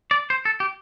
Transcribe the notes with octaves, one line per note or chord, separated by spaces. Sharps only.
D5
C5
A4
G4